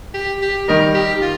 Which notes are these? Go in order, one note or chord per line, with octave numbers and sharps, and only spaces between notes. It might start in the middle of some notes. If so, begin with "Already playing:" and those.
G4
G4
D#3 G3 D#4 A#4
G4
F4